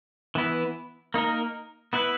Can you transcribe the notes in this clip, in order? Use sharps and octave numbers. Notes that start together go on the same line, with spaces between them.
E3 B3 E4
A#3 D#4 A#4
B3 E4 B4